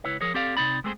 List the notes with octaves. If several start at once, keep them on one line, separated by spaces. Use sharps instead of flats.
C#2 E4 B4 C#5
F3 G#4 A#4 C#5
C4 G4 A4 D5 F5
C3 D#3 C4 D#4 D5 B5
G#3 A3 C4 G#4 B4 C5